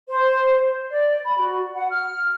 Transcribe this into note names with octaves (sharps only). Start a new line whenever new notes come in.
C5
D5
B5
F#4
F#5
F6